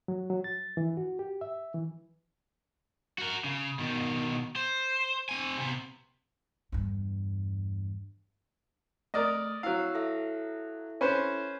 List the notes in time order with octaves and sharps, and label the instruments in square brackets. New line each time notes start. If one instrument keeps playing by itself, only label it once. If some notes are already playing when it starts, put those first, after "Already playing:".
[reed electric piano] F#3
F#3
A6
E3
F#4
G4
E5
E3
[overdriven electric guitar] F#4 A#4
C#3
B2 D#3
C5
C4 G#5
C3 B3
[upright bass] E2 G2
[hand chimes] A3 D#6 F6 [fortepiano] A#4 D5 D#5
[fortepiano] F#3 F5 [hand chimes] E4 E6
[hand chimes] E4 A4 E5
[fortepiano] C#4 B4 C5